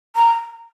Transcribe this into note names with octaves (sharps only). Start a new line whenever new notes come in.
A#5